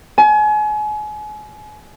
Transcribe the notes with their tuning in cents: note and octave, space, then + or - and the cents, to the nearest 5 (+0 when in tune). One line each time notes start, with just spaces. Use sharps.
G#5 +35